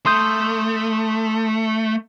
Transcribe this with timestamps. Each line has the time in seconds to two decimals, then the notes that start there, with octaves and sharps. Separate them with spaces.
0.06 A3 C6 D#6 G6